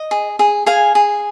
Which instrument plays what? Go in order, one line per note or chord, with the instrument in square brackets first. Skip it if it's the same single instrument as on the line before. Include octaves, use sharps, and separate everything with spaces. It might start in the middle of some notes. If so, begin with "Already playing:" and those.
Already playing: [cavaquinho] D#5
G#4
G#4
G#4 F5 G#5
G#4